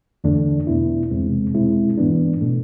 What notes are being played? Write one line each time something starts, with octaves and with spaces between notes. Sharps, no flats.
E2 D3 A3 D4
E2 B2 B3 E4
E2 C3 G#3 C4
B2 G#3 C4 E4
G#2 E3 B3 D4
B2 A3